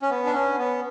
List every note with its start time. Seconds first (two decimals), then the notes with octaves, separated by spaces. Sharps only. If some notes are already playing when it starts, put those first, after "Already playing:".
0.02 C#4
0.10 B3
0.25 D4
0.34 C#4
0.59 B3